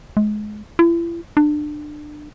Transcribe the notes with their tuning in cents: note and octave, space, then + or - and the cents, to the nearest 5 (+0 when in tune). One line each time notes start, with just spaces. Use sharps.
G#3 +25
E4 +40
D4 +25